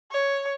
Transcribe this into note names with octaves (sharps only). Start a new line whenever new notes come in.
C#5